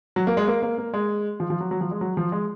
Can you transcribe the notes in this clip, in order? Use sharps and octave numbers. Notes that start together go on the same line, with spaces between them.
F#3
A#3
G#3
A#3
A#3
A#3
G#3
F3
F3
F#3
F#3
F3
G#3
F#3
F3
G#3